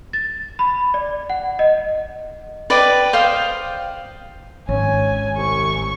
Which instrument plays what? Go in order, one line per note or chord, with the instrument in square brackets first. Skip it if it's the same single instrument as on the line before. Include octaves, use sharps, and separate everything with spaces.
[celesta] A6
B5
D5
F#5
D#5
[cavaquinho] B4 D5 D#5 G5
C5 F5 G5 D#6
[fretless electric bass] G#1 [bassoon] C#4 [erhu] G#5
[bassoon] C2 [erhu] C#6